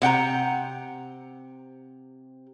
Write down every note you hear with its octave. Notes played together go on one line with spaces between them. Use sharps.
C3 F#5 G5 A#5